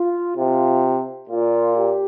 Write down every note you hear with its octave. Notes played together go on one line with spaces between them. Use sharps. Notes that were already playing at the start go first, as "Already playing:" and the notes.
Already playing: F4
C3 F4
A#2 F4
G4